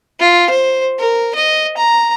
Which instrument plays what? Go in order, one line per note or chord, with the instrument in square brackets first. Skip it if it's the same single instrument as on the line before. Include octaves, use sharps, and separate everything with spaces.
[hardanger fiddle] F4
C5
A#4
D#5
A#5